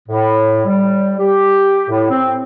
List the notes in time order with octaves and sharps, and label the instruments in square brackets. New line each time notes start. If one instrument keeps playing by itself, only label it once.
[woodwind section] A2
G3
G4
A2
C4